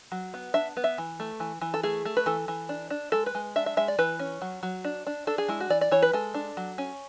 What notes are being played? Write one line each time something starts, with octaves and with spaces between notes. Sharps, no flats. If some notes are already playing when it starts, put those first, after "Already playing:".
F#3
B3
D4 E5
B3
E5
E3
A3
E3
E3
A4
A3 G#4
A3
B4
E3 A4
E3
D4
D4
G#3 A4
B4
G#3
D4 E5
E5
G#3 E5
D5
E3 B4
C#4
F#3
F#3
D4
D4
D4 A4
G#4
G#3 E4
F#4
E3 D5
D5
E3 C#5
B4
G#3 A4
D4
F#3
C#4